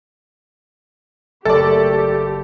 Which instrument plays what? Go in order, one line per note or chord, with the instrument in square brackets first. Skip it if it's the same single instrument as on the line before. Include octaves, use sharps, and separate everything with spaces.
[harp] F#1 [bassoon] A3 [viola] G4 [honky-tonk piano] A4 D5